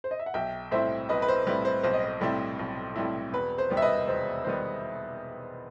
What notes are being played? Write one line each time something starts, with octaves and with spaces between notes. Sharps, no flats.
C5
D#5
E5
F#5
B1 E5 G5
A2 G3 C4 E4 C5 E5
B1 B4 D#5
B4
C5
A2 G3 C4 E4 B4
C5
B1 C5
D#5
C5
A2 G3 C4 E4
B1
A2 G3 C4 E4
E1 B4
C5
D#2 D#3 G3 B3
E5
B4 D#5
E1 C5
D#3 G3 B3 C5